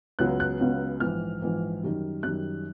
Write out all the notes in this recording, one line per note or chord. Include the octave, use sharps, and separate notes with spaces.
C#2 C#3 F#3 B3 F#6
F#6
C#2 C#3 F#3 B3
A#1 G#2 E3 F6
A#1 G#2 E3
F#2 D#3 G3
F#2 D#3 G3 F#6